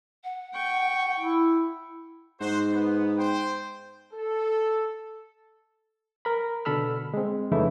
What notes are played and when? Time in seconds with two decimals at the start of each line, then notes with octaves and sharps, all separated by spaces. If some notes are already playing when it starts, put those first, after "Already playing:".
0.24 F#5
0.54 G5 C#6
1.20 E4
2.40 G#2 F#4 C5
2.73 B3
3.18 C5 G5
4.14 A4
6.25 A#4 B5
6.65 B2 D3 A4 B5 E6 F6
7.14 G#3 C4
7.52 F2 C#3 E3 A3 D#4 E4